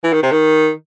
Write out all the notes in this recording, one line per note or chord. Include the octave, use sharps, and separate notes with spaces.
E3
D#3
C3
D#3